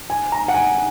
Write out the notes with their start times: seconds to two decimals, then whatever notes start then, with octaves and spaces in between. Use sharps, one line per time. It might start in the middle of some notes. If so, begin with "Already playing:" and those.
0.10 G#5
0.32 A#5
0.48 F#5
0.54 G#5